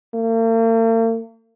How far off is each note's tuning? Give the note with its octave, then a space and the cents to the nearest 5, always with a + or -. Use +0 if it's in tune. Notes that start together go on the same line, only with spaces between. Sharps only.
A#3 -45